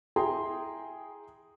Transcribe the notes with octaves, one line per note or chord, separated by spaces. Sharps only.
E4 G#4 G5 A#5 C6